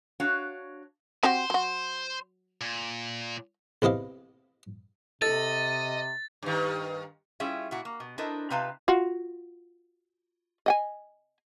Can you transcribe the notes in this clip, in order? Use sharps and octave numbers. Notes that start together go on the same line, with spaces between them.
D4 F#4 C#5 F5
C4 F#4 G4 C5
F#3 F#4
A#2
E2 C3 E4 D#5 F5
C3 A4 D#5 A6
G2 D#3
G3 C#4 E4 F4 G#4 E5
A#2 E4 F#4
A#3
B2
D4 E4 A4 A#4 C5 D#5
C3 D#4 F4 B4 F5 A5
F4 F#4
D#5 G5 G#5